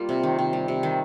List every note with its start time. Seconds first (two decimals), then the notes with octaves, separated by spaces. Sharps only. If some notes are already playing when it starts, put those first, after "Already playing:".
Already playing: G3 A#3 F4
0.09 C3
0.23 D#3
0.39 C3
0.53 G3
0.68 C3
0.83 D#3